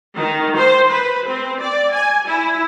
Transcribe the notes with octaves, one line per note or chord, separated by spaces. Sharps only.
D#3
C5
B4
C4
D5
G#5
E4